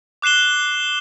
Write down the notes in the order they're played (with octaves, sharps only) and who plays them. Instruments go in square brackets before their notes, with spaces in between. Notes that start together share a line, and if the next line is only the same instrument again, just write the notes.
[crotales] D6 F#6 C7 E7 G7